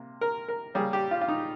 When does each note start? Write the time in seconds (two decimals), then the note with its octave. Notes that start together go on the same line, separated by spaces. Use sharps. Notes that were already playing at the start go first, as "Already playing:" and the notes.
Already playing: C3 A#3
0.21 A#4
0.48 A#4
0.74 C#3 G3 A#3 G#4
0.93 G4
1.11 F4
1.21 F4
1.28 D#4